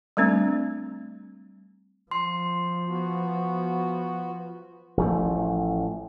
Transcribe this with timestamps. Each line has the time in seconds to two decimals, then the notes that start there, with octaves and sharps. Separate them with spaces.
0.17 G3 A3 C4 D4
2.11 F3 C6
2.88 B3 F#4
4.97 A1 F3 A3